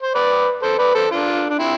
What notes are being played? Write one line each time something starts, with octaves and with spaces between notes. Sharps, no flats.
C5
B4 D5
A4 C5
B4 D5
A4 C5
D4 F4
D4
C4 E4